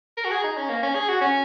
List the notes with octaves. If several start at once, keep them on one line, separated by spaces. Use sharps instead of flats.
A#4
F#4
G#4
D#4
C#4
A#3
C#4
G#4
F#4
C#4